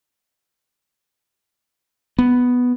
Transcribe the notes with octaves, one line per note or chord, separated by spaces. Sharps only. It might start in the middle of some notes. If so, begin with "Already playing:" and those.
B3